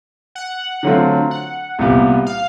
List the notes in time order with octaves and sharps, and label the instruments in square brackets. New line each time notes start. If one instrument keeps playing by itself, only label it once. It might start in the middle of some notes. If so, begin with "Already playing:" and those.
[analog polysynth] F#5
[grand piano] D3 F#3 A3 C4 F4
[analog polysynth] F#5
[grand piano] C2 A#2 G3 B3
[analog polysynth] F5